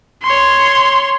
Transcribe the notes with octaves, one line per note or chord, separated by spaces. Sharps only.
C#5 C6